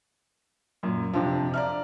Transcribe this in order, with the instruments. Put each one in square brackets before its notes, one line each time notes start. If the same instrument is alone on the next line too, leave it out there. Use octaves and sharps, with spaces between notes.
[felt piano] F#2 A#2
[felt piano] F2 C3 F3 [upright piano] C4 D4 F5
[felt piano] D5 A#5 F6 [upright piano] E5 F5